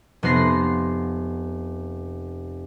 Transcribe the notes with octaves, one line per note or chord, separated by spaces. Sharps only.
F1 B3 C6 A#6 C7